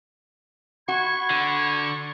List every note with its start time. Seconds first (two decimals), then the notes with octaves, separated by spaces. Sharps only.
0.88 F#4 B5 C#6 G#6
1.30 D3